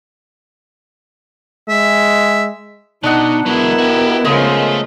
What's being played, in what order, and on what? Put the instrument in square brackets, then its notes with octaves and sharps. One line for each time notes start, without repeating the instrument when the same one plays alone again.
[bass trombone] G#3 [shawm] E5
[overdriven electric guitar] B2 [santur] D4 D#5 F#5 [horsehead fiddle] D#4
[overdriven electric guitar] F#3 G#3 [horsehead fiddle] B3 A#4 [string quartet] E4
[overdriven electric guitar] F#4 G4
[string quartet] C#3 F3 G#3 [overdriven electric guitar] A3 [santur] D#5